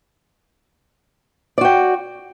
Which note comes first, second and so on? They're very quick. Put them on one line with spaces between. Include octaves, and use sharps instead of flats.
D5 F#4 G5